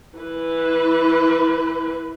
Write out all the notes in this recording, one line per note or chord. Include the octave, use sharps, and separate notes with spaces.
E3 B4